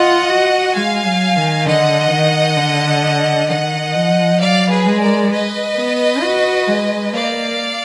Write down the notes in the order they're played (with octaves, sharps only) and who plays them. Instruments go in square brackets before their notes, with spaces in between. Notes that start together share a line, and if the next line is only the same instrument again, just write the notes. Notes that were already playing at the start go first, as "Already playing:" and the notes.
Already playing: [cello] F4 [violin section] D#5 F#5
[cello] F#4
[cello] G#3 [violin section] F5 G#5
[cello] F#3
D#3
[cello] D3 [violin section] D#5 F#5
[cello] D#3
D3
[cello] D#3 [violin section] D#5 F#5
[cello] F3
[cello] F#3 [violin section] D5 F5
[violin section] G#4 B4
[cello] G#3
[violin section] A#4 D5
B4 D#5
[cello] B3
F#4
G#3
[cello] A#3 [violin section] D5 F5